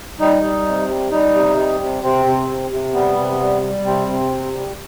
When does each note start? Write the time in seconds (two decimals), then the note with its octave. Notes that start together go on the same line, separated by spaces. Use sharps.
0.20 G3 D#4
0.43 G3
0.66 C3
0.88 G3
1.11 G3 D#4
1.35 C3
1.57 G3
1.80 C3
2.03 C3 C4
2.25 C3
2.49 C3
2.71 C3
2.94 G3 B3
3.17 C3
3.40 G3
3.62 G3
3.85 C3 C4
4.08 C3
4.31 C3
4.54 G3